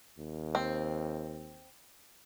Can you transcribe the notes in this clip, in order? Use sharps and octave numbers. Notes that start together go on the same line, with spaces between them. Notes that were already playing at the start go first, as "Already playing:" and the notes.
D#2
C4